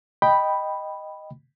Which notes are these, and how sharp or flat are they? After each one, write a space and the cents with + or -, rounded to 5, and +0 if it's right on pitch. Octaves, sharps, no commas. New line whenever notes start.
D#5 +0 G5 +0 B5 +0